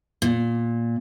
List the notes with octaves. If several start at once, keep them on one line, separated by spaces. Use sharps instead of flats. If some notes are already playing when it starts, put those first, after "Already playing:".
A#2